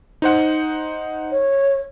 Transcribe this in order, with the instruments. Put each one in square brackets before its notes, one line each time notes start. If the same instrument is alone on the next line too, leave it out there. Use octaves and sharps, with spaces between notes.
[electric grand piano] D#4 C5 F#5
[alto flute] C#5